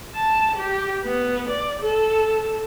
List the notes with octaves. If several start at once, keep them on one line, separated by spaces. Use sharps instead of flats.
A5
G4
B3
D5
A4